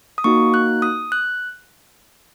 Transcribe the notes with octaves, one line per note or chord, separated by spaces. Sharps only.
D#6
A#3 D#4 F#4 C#6
F#6
D#6
F#6